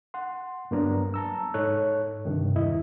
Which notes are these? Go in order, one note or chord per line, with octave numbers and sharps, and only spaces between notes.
F#5 C6
G2 F#3 A#3 B3 D4 A#5
A5 A#5 E6
G#2 D#4 A4 C#5 F#6
G2 C3 D#3
E2 E4 D#5